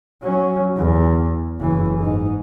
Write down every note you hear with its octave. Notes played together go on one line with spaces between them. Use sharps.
F#3 C#4
E2
F#1 E3
G#2 D#4